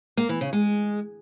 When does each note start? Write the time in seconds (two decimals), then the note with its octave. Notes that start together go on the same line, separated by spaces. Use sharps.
0.17 A#3
0.29 E3
0.41 C#3
0.53 G#3